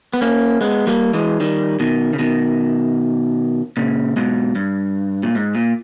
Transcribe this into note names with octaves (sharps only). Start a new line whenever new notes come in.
B3
A#3 C#4
G#3 B3
G3 A#3
E3 G#3
D#3 G3
B2 D#3
C#3
B2 D#3
A#2 C#3
G#2 B2
G2
A#2
G#2
A#2